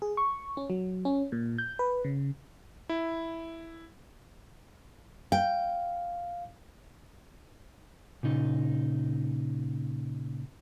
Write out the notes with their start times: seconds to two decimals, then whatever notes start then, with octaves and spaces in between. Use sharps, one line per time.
0.02 G#4
0.17 C#6
0.57 C#4
0.70 F#3
1.05 C#4
1.32 A#2
1.58 G6
1.79 B4
2.04 C#3
2.89 E4
5.32 F5 G5
8.23 A#2 C#3 D#4